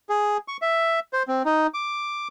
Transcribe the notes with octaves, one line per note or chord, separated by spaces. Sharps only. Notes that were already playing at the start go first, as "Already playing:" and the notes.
G#4
C#6
E5
C5
C4
D#4
D6